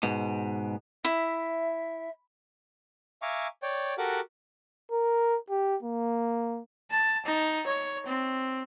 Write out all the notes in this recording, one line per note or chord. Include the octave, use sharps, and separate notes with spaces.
G#2 B2
E4 E5
E5 F5 G#5 A#5 C#6 D6
C#5 D5 G5
F#4 G4 A4 A#4 F#5 D6
A#4
G4
A#3
A5
D#4
C#5
C4